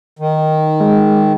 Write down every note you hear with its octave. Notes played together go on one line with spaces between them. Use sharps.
D#3
G#3